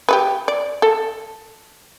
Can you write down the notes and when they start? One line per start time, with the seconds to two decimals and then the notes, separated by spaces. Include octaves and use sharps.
0.09 G4 A4 B4
0.48 D5
0.82 A4